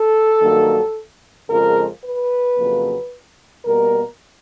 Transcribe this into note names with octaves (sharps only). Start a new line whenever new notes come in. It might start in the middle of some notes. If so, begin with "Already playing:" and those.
Already playing: A4
G2 D#3 F#3 A#3
F2 C#3 F3 G#3 A#4
B4
F2 C#3 F#3 A#3
B2 G3 A#3 A#4